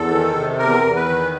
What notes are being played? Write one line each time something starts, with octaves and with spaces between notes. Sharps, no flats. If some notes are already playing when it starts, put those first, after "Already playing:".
Already playing: E2 A4
D#3
C3
E2 A#4
E2
B4
D#3